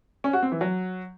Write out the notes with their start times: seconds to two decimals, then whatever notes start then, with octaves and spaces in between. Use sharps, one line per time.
0.24 C#4
0.33 F#4
0.43 C4
0.52 E3
0.61 F#3